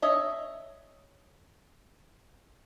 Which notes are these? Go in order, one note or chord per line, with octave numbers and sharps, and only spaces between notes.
C#5 D#5 E5